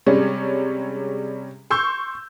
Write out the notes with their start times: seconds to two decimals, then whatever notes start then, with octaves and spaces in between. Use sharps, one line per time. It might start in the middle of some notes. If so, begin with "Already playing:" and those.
0.06 C3 G3 G#3 C#4
1.70 C6 C#6 E6 G6